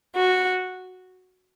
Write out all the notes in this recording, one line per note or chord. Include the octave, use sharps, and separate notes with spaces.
F#4